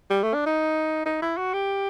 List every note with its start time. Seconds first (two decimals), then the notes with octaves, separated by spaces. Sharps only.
0.10 G3
0.23 A3
0.34 D4
0.46 D#4
1.06 D#4
1.22 E4
1.37 F#4
1.54 G4